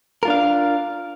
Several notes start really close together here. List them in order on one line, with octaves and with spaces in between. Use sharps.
A#4 F4 D4 F5